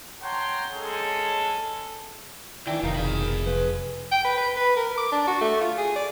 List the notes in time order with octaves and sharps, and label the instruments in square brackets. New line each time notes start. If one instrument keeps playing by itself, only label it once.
[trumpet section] C#5 F#5 G5 A5 A#5 C6
G#3 C#4 G#4 A4
[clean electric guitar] D2 D#3 G5 [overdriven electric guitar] E3 [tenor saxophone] D4
[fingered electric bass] F1 [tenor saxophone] D#3 [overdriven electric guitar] D#4 [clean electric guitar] F5
[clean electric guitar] B2 [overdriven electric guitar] G#4 B5
[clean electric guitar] C3 F3 [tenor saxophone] B4
[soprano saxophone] G5
B4
B4
B4
A#4
D6
D4
F#4
A3
F4
G#4
D5